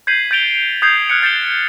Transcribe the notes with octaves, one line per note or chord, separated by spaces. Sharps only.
G6 G#6 B6 C7 D#7 F#7
G6 A6 D7 F7 G7
D#6 G6 G#6 C7 F7
F6 F#6 G#6 C#7
G6 A6 C7 C#7 E7 G7